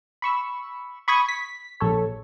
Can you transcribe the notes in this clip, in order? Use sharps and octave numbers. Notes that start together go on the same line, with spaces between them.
B5 C#6 E6
B5 C#6 D#6 G#6
B6
A#1 A4 C#5